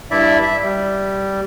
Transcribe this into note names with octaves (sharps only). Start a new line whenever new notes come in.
G2 E4 D5 E5
E5
G3